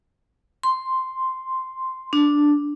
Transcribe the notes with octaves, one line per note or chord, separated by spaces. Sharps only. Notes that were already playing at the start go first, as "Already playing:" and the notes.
C6
D4